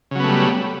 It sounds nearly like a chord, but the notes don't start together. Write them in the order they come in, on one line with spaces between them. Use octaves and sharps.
C#3 F#3 B3 A3 G3